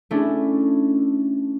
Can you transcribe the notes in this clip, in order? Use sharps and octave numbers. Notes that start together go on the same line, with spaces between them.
A3 C#4 D4 E4